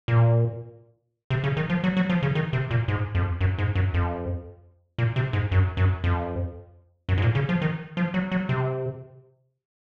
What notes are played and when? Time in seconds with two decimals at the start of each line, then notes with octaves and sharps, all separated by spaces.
0.08 A#2
1.30 C3
1.44 C#3
1.57 D#3
1.70 F3
1.84 F#3
1.97 F#3
2.10 F3
2.22 C#3
2.35 D#3
2.53 C3
2.71 A#2
2.88 G#2
3.15 F2
3.41 F#2
3.58 G#2
3.75 F#2
3.94 F2
4.98 A#2
5.16 C3
5.33 G#2
5.52 F#2
5.77 F#2
6.04 F2
7.09 F#2
7.18 G#2
7.22 A#2
7.35 C#3
7.49 F3
7.62 D#3
7.97 F3
8.14 F#3
8.32 F#3
8.49 C3